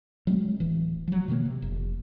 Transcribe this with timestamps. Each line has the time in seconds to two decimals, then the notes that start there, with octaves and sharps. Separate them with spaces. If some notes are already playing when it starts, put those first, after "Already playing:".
0.27 F#3 G#3 A3 C4
0.60 D1 E3
1.08 F3 F#3
1.28 B2 D#3 F3 A#3
1.45 C3
1.62 F1